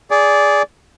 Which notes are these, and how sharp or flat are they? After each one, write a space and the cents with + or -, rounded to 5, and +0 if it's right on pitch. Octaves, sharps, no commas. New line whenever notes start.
G#4 +0 D5 -15